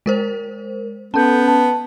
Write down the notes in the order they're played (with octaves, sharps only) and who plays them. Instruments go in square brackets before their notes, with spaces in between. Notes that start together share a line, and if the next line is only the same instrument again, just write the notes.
[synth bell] G#3 A#4 C5
[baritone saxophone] B3 [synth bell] C#4 A4 [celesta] A5 G6
[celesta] A5